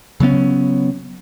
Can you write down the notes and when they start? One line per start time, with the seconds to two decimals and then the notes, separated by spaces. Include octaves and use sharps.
0.20 C#3 F#3 B3 C#4